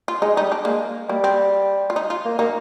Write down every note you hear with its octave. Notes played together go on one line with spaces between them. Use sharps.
F4
G#3 D#4
G3 D#4
D4
G#3 A#3
G3 A#3
C4
F4
D#4
F4
A#3
A#3 D#4